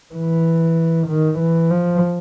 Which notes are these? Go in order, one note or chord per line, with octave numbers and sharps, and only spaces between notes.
E3
D#3
E3
F3